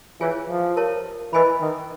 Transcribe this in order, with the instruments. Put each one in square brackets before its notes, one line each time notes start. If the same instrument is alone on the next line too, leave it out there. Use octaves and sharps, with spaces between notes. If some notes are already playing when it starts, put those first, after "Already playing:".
[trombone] E3 [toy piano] F4 G#4 C#5 F5 G#5
[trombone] F3
[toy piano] G4 A#4 C#5 E5 A5
[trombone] E3 [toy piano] B4 D#5 G#5 B5
[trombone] D#3